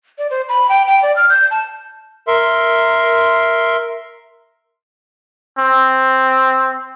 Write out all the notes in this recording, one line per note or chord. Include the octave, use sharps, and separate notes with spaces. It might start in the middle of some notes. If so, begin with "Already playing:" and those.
D5
C5
B5
G5
G5
D5
F6
G6
A5
A#4 E5 C6
C4